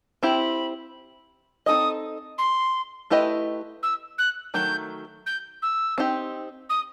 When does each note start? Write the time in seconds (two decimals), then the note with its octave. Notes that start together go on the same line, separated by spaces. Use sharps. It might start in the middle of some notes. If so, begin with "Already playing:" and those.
0.23 C4 E4 G4 B5
1.66 C4 D#4 A4 D#5 D#6
2.38 C6
3.10 A3 E4 G4 B4 D#5
3.83 E6
4.18 F#6
4.54 D#3 F#3 A3 G6
5.26 G6
5.62 E6
5.98 C4 D#4 G4
6.69 D#6